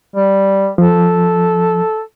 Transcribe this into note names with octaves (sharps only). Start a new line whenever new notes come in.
G3
F3 A4